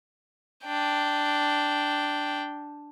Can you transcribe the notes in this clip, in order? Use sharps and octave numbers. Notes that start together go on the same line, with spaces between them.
D4 G5